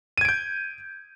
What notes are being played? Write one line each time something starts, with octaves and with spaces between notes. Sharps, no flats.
G6 G#6 D7 D#7